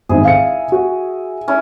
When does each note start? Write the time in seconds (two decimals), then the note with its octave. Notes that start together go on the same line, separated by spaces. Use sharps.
0.09 G#1 G#2 E4 G#4
0.25 F5 C#7
0.72 F#4
1.48 C#4 E4